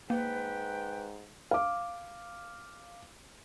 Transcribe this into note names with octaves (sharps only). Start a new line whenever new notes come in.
G#2 A#3 B4 G5
F5 D6